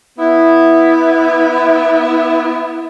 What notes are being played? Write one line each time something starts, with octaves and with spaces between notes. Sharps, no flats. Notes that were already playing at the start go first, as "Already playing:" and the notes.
B3 E4